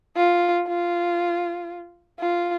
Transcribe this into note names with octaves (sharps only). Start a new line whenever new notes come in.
F4
F4
F4